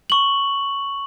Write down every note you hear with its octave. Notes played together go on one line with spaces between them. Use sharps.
C#6 F#7